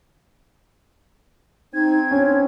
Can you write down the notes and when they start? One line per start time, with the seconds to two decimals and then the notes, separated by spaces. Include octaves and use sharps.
1.74 C4 D#4 G#6
2.11 C#4 D4